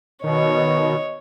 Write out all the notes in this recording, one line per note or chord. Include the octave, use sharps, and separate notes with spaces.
B2 D#3 C#5 D#5